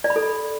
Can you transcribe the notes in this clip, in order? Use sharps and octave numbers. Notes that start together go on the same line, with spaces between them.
D5
B5
A4